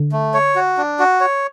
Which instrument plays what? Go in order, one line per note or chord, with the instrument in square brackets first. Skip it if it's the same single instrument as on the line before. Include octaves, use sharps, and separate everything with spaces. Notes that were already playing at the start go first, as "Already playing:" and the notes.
Already playing: [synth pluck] D3
[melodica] A3
C#5
F#4
D4
F#4
C#5